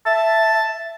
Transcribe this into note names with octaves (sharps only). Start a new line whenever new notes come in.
E5 A5